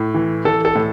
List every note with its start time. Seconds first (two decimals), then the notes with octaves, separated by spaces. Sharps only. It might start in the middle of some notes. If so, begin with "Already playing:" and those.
Already playing: A2
0.14 E3
0.45 E3 A4
0.65 A4
0.75 A2